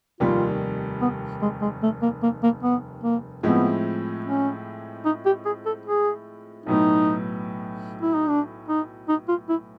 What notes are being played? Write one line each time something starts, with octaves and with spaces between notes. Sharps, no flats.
F1 D#2 D#3 G3 F4
B3
G#3
G#3
A3
A#3
A#3
A#3
B3
A#3
A2 F3 G#3 B3 C4 E4
C#4
D#4
G4
G#4
A4
G#4
B1 A2 F#3 B3 D#4
E4
D#4
D4
D#4
D#4
F4
E4